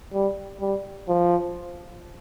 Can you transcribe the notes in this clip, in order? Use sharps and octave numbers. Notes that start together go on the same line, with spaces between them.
G3
G3
F3